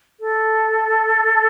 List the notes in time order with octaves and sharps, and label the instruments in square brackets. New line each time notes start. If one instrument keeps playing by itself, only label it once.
[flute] A4